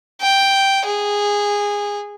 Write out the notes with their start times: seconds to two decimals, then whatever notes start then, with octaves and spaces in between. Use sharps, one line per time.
0.21 G5
0.85 G#4